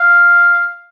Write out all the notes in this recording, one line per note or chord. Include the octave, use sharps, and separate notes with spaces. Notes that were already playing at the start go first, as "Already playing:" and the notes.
Already playing: F5